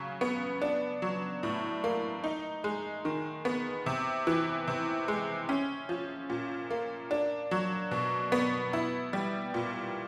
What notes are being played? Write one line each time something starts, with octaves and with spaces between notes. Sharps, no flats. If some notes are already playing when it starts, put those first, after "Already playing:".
Already playing: C#3 F#3
B3
D4
F#3
A2
A#3
D#4
G#3
D#3
B3
C3
E3
C3
G#3
C#4
F3
A#2
A#3
D4
F#3
B2
B3
E4
G3
A#2